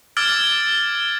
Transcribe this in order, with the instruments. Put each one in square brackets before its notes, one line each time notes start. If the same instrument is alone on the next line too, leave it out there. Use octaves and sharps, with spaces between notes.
[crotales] D6 E6 F6 G#6 A6 D7